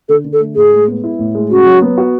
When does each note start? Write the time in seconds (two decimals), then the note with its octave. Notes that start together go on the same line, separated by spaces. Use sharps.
0.09 D3 A4
0.24 D3
0.33 A4
0.40 A3
0.56 A2 G#4
0.71 G#3
0.88 B3
1.04 E4
1.19 A2
1.35 G#3
1.50 C#3 F#4
1.66 F#3
1.82 B3
1.98 F#4